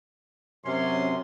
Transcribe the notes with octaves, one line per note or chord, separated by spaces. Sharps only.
F#2 C3 C#4 C6